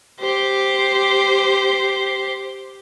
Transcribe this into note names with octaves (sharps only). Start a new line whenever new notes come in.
G4 C5